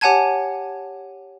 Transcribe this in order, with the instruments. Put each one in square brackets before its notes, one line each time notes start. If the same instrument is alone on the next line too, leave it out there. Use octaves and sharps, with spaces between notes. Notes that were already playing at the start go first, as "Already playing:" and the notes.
[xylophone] G4 C#5 F#5 G#5 A5 G#6